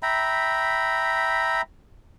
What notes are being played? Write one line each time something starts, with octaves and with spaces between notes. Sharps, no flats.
E5 G5 A#5 B5